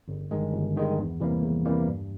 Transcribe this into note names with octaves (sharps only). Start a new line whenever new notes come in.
G1
G2 D#3 G#3
G1
G2 D#3 G#3
E2
C3 E3 G3 A#3
E2
C3 E3 G3 A#3
G2